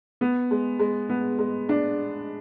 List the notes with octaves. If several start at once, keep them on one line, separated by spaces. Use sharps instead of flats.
B3
G#3
G#3
B3
G#3
D4